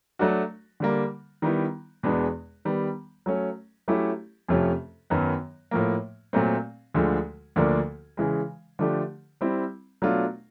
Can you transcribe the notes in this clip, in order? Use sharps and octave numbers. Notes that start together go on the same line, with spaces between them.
F#3 A3 D4 F#4
D3 G3 A#3
D#3 G3 B3 E4
E2 B2 G#3 B3 D4
D#3 G3 B3
F#3 A3 C#4
F#3 A3 C#4 E4 G4
F2 C3 F3 A3 C#4
F#2 D#3 F#3 B3
A2 F3 A#3
A#2 F#3 A3 C4
D2 D3 F3 G#3
D2 D3 F3 A#3 D4
C#3 E3 G#3
D3 F3 A3 D4 G4
G3 C4 E4
B2 F#3 A3 D4 F4